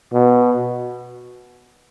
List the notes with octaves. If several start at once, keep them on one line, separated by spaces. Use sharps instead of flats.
B2